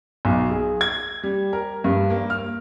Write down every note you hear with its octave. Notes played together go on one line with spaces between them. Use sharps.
B1
G#4
G#6
G3
A#4
G2
A#3
F6